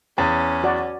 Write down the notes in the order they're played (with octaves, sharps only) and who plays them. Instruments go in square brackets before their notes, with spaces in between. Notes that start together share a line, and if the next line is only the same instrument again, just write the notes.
[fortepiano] E2 [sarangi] C#4
[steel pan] F#4 D5